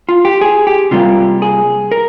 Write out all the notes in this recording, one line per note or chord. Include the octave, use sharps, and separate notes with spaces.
F4
G4
G#4
G4
C3 G3 A#3 F4
G#4
A#4